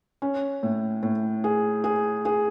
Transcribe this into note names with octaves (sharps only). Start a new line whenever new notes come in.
C#4
A2
A2
G#4
G#4
G#4